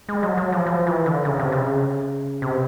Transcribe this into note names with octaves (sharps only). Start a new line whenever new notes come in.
G#3
F#3
F#3
F3
F3
E3
D3
C#3
C3
C#3
C3